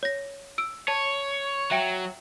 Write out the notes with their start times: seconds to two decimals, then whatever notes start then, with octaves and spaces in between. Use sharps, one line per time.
0.03 C#5 A#6
0.58 E6 D7
0.88 C#5 A5
1.71 F#3 E5 G5 D7